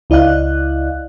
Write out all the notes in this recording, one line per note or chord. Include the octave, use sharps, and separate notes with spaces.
C#2 E4 D5 D#5 F5 F#6